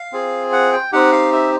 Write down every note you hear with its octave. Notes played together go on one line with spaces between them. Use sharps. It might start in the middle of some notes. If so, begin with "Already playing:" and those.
Already playing: F5
C4 F4 G#4
F#5
G5
C4 D#4 G4 F#5
F5
E5